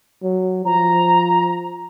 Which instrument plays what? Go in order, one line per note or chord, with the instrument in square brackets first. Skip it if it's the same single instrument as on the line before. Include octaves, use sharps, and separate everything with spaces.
[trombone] F#3
[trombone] F3 [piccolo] A#5